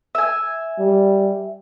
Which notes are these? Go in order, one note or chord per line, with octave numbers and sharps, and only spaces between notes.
E5 G#5
G3